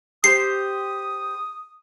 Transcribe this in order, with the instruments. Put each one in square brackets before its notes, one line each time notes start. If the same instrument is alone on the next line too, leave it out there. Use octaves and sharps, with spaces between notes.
[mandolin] G4 C5 [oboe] D#6 [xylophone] C7